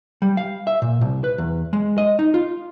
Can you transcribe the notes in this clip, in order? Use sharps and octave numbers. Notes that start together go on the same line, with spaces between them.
G3
F5
E5
A#2
C2
B4
E2
G#3
D#5
D#4
F4